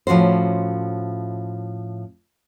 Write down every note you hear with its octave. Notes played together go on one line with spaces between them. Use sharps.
A2 F3 C#4 F#4 C5